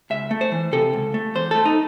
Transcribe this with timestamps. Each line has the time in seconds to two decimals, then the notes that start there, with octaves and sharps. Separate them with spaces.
0.10 C#2 E5
0.31 A3
0.41 C5
0.52 E3
0.72 C3 A4
0.93 C#2
1.14 A3
1.35 E2 C5
1.51 A3 A4
1.65 D#4